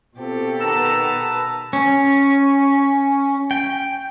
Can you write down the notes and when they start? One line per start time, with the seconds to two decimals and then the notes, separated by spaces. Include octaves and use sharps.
0.18 B2 C4 F4 G4 A4
0.61 D#3 B3 B4 A5 A#5 E6
1.73 C#4
3.51 G5